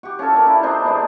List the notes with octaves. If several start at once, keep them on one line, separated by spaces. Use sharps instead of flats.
F#4 G4
C#4 F4 A4 C#5
D4 A#4
E4
C4 D4 D#4 C5
B2 D3 G#3